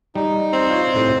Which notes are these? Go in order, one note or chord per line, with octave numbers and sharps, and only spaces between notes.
G3 D#4
C4
F4 C#5
A2 C3